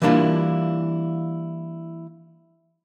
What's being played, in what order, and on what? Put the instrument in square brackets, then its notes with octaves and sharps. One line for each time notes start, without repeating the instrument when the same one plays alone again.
[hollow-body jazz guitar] E3 G3 A#3 D4 E4 F4